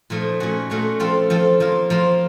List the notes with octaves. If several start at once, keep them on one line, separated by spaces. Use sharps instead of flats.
A#2 F3 A3 D#4
A#2 A3 C#4 F#4
A#2 A3 C#4 F#4
F3 C4 F4 A4
F3 C4 F4 A4
F3 A#3 F4
F3 A#3 F4